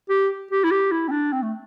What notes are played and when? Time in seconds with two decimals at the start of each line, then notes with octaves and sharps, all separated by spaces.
0.10 G4
0.51 G4
0.64 E4
0.71 G4
0.92 E4
1.08 C4
1.12 D4
1.33 C4
1.42 A3